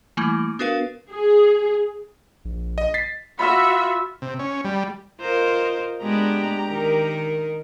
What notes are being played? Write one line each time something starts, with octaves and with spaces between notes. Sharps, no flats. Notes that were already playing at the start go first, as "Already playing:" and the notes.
E3 G3 A3 A#3 E4
B3 D4 F#4 A#4 B4 F5
G#4
A#1
D#5
A6 B6 C7
F4 F#4 E5 B5 F6
C3
C#4
G3
F4 A#4 C5 D#5
G#3 B3 D4 G4 A#5
D#3 D#4 A#4